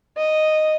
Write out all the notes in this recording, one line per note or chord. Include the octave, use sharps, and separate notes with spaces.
D#5